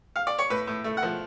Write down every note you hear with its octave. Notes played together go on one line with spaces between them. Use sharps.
F5
D5
C#5
A2 B4
A2
A3
F#5
F3